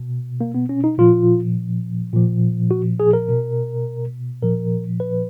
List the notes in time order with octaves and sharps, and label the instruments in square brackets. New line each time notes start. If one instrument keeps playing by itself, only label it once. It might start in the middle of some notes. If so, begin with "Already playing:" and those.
Already playing: [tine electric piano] B2
A#3
B3
C#4
D#4
A#2 F3 F4
A#2 F3
F#4
G#4
A#4
B2
A#2 F3 A#4
B4